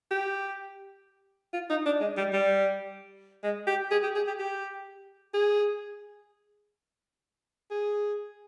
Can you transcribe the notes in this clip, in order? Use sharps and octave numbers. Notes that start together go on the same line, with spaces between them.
G4
F4
D#4
D4
G#3
G3
G3
G#3
G4
G#4
G4
G#4
G4
G4
G#4
G#4